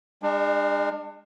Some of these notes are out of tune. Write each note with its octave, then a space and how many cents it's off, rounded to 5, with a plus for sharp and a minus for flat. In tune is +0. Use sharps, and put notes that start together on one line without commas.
G#3 -35 D4 +30